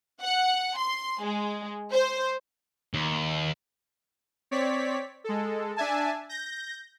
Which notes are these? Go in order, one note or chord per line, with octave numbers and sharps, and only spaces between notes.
F#5
C6
G#3
C5
D#2
C4 C#5 D5 B6
G#3 A4
D4 E5 G#5 A5
G6 A#6